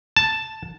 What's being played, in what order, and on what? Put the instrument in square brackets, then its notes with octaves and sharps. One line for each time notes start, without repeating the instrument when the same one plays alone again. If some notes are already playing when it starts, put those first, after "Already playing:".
[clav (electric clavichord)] A5